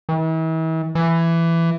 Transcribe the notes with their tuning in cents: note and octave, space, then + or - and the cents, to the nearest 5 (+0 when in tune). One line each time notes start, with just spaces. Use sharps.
E3 -40
E3 +15